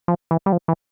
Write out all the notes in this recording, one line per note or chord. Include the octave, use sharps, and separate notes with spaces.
F3
E3
G3
F3
E3